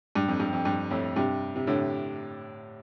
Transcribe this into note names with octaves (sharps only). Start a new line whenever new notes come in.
G2
F2
G2
F2
G2
F2 A2
G2 C3
C3
A2 D3